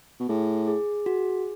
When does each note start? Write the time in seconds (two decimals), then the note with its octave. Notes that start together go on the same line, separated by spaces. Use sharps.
0.20 B2
0.29 A2 G#4
0.68 G#4
1.06 F#4